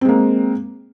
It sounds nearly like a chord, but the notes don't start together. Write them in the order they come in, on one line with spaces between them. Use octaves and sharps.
C4 G#3 A#3